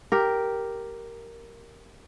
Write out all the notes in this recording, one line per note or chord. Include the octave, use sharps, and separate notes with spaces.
G4 A#4